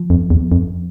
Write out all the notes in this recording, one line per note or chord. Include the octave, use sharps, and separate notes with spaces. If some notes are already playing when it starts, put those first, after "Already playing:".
Already playing: F3
F2
E2
F2